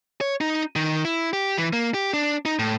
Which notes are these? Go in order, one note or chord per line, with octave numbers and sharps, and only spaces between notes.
C#5
D#4
D#3
E4
G4
E3
A#3
G4
D4
D#4
A2